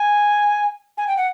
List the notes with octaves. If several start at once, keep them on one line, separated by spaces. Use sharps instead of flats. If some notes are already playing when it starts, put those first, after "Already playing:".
Already playing: G#5
G#5
G5
F#5